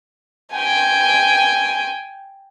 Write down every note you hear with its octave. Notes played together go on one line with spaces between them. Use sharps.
G5 G#5